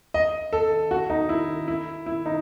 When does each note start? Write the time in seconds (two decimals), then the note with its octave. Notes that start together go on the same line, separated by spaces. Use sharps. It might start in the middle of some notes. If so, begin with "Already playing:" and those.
0.14 D#5
0.53 A4
0.91 F#4
1.10 D#4
1.29 E4
1.68 E4
2.06 E4
2.26 D#4